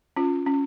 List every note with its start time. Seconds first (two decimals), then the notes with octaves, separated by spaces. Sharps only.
0.16 C#4 F4
0.46 C#4